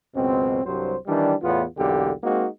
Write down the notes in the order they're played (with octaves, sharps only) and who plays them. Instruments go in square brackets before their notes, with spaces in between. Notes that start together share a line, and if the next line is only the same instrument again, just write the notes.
[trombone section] C#2 F#2 B2 C4
C2 G2 F#3 C5
D#3 E3 G3 D4
E2 A2 B3 F4
B1 E2 D3 A#3 G4
G#3 A#3 C4 D#4 F#4